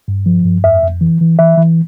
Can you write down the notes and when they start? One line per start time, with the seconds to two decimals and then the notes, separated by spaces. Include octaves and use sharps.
0.08 G2
0.26 F3
0.45 G2
0.64 F2 E5
0.83 F2
1.01 E3
1.21 E3
1.39 E3 E5
1.57 E3